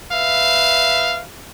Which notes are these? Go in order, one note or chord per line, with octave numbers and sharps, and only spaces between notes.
B4 E5 F5